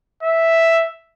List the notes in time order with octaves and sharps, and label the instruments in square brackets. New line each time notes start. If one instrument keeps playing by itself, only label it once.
[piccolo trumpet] E5